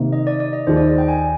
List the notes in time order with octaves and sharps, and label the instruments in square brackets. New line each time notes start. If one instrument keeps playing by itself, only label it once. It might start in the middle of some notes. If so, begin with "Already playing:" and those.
Already playing: [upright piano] C3 D#3 A#3 D#4
[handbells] D#5
D5
D5
D#5
[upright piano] D#2 D#3 A#3 F4 G#4 [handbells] C5
[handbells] D5
D#5
G5
G#5